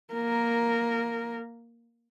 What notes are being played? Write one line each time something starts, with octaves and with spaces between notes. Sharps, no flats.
A#3 A#4